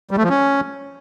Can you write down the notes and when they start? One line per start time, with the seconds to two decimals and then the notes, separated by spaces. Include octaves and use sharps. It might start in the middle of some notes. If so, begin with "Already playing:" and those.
0.11 G3
0.17 A3
0.23 F3
0.30 C#4